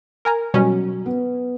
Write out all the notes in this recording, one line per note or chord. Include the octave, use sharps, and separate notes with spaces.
A#4 G#5 A#5
B2 F#3 G3 C#4
B3